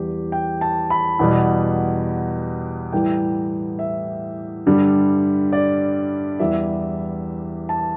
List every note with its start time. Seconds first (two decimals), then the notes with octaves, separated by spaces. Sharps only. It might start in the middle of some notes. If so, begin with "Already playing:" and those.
Already playing: E2 E3 G3 G4
0.32 G5
0.61 A5
0.90 B5
1.19 E2 B2 G3
2.92 A2 E3 G3 G5
3.79 E5
4.66 G2 D3 G3
5.53 D5
6.40 E2 E3 G3 E5
7.69 A5